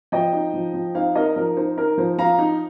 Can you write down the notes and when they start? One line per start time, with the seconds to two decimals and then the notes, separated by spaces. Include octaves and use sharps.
0.12 F3 D#5 G5
0.33 D#4
0.54 F3
0.74 F3
0.94 D#4 C5 F5
1.15 D#4 A#4 D#5
1.36 F3 A#4
1.57 D#4 C5
1.77 D#4 A#4
1.98 F3 C5
2.18 F3 F5 A#5
2.39 D#4